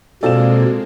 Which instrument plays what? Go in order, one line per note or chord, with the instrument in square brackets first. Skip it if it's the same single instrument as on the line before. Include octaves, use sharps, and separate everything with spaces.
[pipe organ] B2 [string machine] G#3 A#3 [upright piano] C4 F4 D5 [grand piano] A4 E7